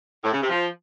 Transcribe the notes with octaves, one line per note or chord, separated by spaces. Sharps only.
A2
C#3
C3
F3